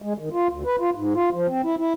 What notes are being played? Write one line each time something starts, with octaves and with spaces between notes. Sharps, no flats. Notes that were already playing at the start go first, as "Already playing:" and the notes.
G#3
D#3
F4
D2
B4
F4
G#2
F4
F3
C4
E4
E4